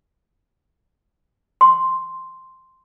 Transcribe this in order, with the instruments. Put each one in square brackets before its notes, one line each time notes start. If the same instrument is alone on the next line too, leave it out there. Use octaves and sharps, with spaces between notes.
[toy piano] C6